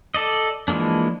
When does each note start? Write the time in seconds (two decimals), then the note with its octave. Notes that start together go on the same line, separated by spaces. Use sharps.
0.14 A4 D5 D#5
0.68 E3 F3 G#3 A#3 D4